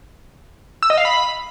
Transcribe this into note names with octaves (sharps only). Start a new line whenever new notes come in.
E6
D#5
F5
B5